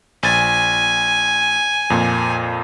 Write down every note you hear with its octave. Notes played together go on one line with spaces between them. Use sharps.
A#1 G#5 A6
F2 A#2